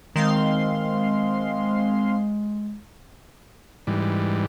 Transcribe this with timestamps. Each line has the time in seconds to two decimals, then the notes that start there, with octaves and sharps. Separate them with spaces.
0.16 D#3 G#3 C4 F5 C6
3.87 G#2 E3 G3